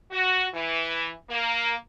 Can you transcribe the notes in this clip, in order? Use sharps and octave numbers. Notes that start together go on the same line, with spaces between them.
F#4
E3
A#3